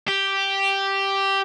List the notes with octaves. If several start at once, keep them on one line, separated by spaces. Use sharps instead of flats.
G4